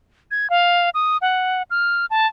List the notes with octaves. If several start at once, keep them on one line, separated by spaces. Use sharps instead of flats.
G#6
F5
D#6
F#5
F6
A5